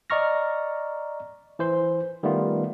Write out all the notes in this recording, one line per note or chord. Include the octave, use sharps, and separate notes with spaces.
D5 D#5 A#5 C#6 F6 A#6
E3 C5 C6
D#3 G3 A3 B3 F4